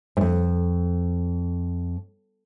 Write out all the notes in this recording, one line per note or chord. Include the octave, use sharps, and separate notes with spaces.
F2 G#2